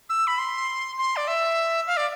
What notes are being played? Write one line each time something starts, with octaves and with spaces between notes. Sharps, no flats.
E6
B5
C6
C6
D5
E5
F5
D5